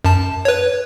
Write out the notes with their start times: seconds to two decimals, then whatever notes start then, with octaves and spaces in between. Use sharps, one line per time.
0.05 F#2 A5
0.45 B4 C#5